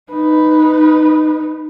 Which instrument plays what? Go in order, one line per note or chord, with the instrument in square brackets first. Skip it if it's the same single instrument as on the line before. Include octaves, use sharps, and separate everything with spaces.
[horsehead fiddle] D#4 B4